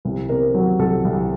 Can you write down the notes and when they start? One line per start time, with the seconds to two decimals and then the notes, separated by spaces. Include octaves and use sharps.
0.05 C2
0.29 C3 A#4
0.54 F#3
0.79 C2 A4
1.05 C2